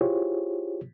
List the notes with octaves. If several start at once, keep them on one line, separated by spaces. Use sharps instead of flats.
E4 F4 G4 G#4 C5 C#5